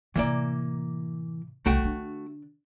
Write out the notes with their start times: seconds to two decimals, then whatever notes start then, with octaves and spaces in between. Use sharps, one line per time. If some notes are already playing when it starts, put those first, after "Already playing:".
0.16 A2 C3 E3 A#3 D5
1.66 C2 C#3 A3 F#4 G5
1.80 D3 D4